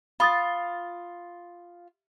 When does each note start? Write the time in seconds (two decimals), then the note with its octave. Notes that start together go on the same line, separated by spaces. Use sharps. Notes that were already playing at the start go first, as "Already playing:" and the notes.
0.20 F4 B5 D#6 A6